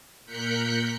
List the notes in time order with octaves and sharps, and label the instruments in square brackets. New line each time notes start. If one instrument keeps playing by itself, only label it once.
[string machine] A#2 A#4 F#6 G6 B6 C#7